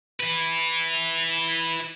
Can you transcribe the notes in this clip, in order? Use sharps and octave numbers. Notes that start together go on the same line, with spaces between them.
E4 B4